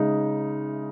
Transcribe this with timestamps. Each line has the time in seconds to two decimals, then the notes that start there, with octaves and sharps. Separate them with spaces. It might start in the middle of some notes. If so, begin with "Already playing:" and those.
Already playing: C#3 G#3 D#4